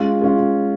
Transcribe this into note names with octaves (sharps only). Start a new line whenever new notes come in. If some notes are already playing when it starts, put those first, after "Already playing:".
Already playing: G#3 C#4 F4
G#3 C#4 F4